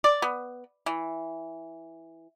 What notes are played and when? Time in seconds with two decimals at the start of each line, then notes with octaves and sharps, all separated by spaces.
0.04 D5
0.22 B3
0.86 E3